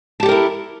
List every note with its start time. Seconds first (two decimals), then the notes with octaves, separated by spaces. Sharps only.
0.20 A5
0.23 G4
0.26 A4
0.29 A#4
0.31 E4